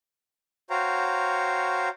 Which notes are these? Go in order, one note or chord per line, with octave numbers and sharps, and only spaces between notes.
F#4 C5 C#5 F5 G5 A#5